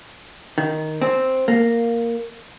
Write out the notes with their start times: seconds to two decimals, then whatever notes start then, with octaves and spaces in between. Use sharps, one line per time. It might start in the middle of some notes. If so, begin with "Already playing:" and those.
0.58 D#3
1.02 C4
1.48 A#3